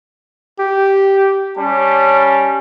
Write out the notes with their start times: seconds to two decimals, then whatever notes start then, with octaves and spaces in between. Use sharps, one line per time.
0.59 G4
1.57 G3 C#4 A5